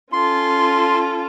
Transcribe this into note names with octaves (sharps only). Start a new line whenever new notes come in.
C#4 F4 A4 C6